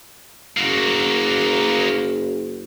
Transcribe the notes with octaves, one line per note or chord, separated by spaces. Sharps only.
F#1 A#3 F#4